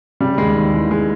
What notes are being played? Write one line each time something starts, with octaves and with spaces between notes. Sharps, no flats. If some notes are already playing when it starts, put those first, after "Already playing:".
C#3 G3
D#2 G#3
D#2
E3
G#3